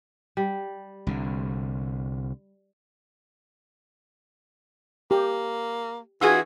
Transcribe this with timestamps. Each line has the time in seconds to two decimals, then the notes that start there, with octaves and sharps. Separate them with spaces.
0.37 G3
1.07 C2 D3
5.11 A#3 G4
6.21 E3 F4 F#4 G#4 E6